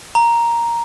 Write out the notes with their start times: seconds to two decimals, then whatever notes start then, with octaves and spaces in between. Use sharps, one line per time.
0.15 A#5